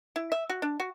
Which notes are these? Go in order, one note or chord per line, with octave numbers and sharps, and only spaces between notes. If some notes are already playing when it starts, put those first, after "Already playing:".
E4
E5
F#4
D4
F#4